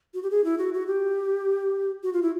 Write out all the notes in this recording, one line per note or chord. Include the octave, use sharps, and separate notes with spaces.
F#4
G4
G#4
E4
F#4
F#4
G4
F#4
F4
E4